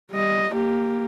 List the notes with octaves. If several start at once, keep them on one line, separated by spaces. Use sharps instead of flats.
G3 D#5
A#3 G4